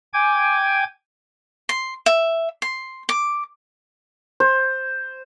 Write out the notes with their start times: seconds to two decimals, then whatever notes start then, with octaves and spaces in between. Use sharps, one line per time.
0.13 G5 G#5 D6 G#6
1.69 C6
2.06 E5
2.62 C6
3.09 D6
4.40 C5